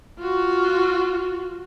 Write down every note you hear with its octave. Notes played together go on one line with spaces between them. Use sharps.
F4 F#4